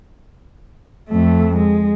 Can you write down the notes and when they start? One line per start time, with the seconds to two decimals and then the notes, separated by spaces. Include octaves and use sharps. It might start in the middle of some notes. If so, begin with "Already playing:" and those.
1.09 F2 A3
1.57 G#3